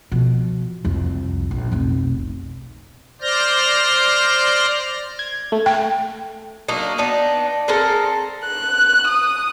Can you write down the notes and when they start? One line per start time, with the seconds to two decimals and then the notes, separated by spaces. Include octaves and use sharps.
0.12 B2 F3
0.85 C2 F2
1.51 A#1
1.71 F1 B1
3.21 C5 D5 F6 G6 A#6
5.19 G#6
5.52 A3
5.66 G5
6.68 F#3 A#3 D4 D#4
6.98 B3 D4 D#4
7.68 G#3 C4 A4 A#4
8.46 F#6
9.07 D#6